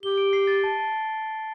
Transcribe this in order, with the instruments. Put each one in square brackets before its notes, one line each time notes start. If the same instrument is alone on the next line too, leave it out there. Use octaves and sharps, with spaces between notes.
[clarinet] G4 [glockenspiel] G7
[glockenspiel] D7
C7
A6
A5
A5